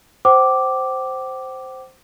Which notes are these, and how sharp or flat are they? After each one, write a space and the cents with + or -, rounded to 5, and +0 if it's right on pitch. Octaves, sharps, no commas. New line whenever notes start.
C5 +0 G5 -45 D6 +0